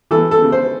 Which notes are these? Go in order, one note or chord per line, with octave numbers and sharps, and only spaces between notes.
E3 A4
A4
C#3
C5